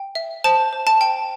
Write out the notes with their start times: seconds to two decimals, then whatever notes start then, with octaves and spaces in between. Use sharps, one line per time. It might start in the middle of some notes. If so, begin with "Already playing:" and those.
Already playing: G5
0.15 E5
0.44 C5 A5
0.73 C5
0.87 A5
1.01 G5